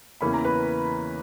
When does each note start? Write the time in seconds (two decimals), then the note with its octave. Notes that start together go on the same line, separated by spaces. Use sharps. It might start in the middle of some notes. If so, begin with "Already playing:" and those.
0.21 E2 C#3 E3 A#3 C#4 B5
0.34 A#5
0.44 B4 B5